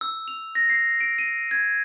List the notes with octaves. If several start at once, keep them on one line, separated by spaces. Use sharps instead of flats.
E6
F7
A#6
C7
D7
D#7
G#6